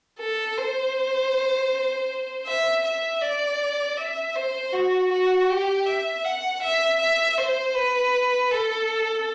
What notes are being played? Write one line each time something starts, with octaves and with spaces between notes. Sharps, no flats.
A4
C5
E5
E5
D5
E5
C5
F#4
F#4
G4
E5
F#5
E5
E5
C5
B4
A4